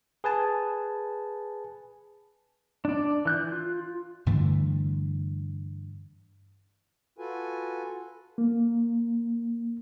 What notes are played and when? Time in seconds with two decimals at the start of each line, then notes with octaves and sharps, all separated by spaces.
0.24 G#4 B4 G#5 A5
2.85 D4 D5
3.25 E3 F#6 G6
3.52 F4
4.26 G2 D3 E3 A3
7.18 F4 F#4 A4 B4 G#5
8.38 A#3